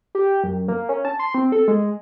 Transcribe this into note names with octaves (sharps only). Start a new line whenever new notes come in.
G4
F#2
A#3
C#4
A5
C6
C4
A4
G#3